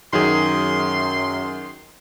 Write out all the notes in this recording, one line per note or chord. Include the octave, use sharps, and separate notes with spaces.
F#2 D#3 F#3 G#4 C6